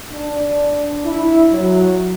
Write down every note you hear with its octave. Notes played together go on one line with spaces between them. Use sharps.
D4
E4
F#3